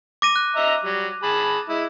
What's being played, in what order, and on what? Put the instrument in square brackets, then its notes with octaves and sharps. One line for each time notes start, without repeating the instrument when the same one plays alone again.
[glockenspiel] D6 A#6 D#7
F#6
[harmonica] D#5 E5 A#5
F#3 G3
G#4 A5 B5
G#3 E4